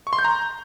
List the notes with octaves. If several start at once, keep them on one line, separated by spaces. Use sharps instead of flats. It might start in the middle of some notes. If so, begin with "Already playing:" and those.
C#6
C6
G6
A#5